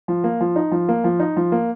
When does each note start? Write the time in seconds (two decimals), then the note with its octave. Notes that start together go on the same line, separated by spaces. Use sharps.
0.08 F3
0.24 A#3
0.41 F3
0.56 D#4
0.72 F3
0.89 A#3
1.04 F3
1.20 D#4
1.37 F3
1.52 A#3